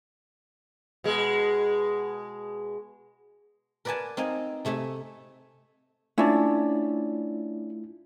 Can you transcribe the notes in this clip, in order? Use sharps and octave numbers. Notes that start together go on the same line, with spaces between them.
B2 G#3
A#4 B4 D5 F#5 G#5 A5
C4 D#4 F5 G#5
C3 A3 E5 G#5
A3 C#4 D4 E4 F4 D5